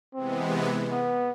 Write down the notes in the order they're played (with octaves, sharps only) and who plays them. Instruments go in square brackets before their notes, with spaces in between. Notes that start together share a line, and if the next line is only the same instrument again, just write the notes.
[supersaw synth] C3 E3 G#3 B3 [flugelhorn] C4
[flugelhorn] B3